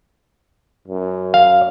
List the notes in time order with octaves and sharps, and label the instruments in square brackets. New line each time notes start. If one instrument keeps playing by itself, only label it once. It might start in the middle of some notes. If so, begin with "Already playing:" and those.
[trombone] F#2
[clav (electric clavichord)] F5